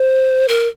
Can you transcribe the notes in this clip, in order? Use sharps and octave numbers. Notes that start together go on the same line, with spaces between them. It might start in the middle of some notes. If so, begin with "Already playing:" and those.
Already playing: C5
A#4